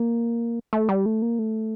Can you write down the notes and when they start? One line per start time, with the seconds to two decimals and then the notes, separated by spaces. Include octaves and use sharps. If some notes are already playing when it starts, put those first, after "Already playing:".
Already playing: A#3
0.73 A3
0.89 G3
1.06 A3
1.22 A#3
1.39 A3